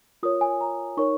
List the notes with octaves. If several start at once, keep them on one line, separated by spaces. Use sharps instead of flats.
F4 A#4 C#5 D#6
G#5
A#5
D#4 A#4 C#5 C#6